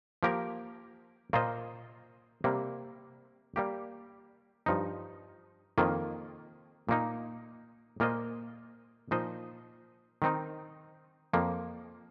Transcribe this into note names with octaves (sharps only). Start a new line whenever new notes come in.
F3 A#3 G4 A#4
A#2 A#3 F4 C5 D#5
C3 G3 A#3
G3 A#3 G4
G2 F3 D#4
F2 D#3 A#3 F4
A#2 A#3 D#4
A#2 A#3 F4 C5 D#5
A#2 F3 D#4 C5 D#5
D#3 C4 D#4
F2 F3 A#3